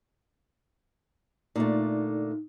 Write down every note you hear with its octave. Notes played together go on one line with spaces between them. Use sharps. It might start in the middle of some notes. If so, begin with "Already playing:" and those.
A#2 D3 A3 D#4